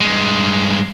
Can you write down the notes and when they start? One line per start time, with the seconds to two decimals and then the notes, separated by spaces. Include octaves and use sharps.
0.01 G2 G#3